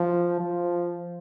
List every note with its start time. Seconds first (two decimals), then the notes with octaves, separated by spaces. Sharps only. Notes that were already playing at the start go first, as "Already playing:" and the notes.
Already playing: F3
0.40 F3